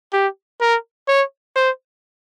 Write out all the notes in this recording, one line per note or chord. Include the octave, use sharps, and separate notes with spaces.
G4
A#4
C#5
C5